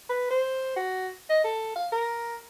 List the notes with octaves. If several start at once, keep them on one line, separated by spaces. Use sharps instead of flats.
B4
C5
F#4
D#5
A4
F5
A#4